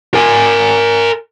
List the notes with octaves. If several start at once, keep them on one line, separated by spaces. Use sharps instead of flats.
A#4 G#5